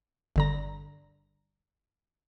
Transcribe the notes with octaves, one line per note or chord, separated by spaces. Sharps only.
G1 D3 A#5